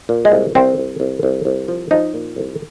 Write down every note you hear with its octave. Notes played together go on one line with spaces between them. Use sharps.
A#2
G#3
C2
C2 C4
C2
C2
C2
C2
F3
F3 D#4
A#2
C2